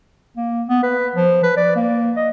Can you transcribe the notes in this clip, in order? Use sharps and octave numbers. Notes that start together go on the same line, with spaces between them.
A#3
B3
B4
F3
B4
D5
A#3
D#5